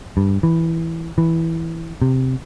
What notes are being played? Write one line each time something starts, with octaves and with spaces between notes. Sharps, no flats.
G2
E3
E3
C3